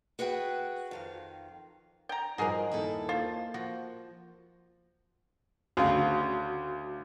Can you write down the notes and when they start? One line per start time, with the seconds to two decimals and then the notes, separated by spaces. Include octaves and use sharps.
0.19 F#4 G#4 B4 E5 F#5 G5
0.91 F2 D#3 F5
2.09 G5 A#5
2.38 G2 F3 D#4 F#4 G#4 A#4
2.72 D#2 E4 A4
3.09 A#3 F4 C5
3.54 F3 F#4
5.77 D2 C#3 F#4 F5